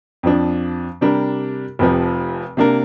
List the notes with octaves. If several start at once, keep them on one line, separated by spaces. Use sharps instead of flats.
F2 F3 D4
C3 G3 D4 A#4
F1 F2 C3 F3
C3 A#3 D4 A#4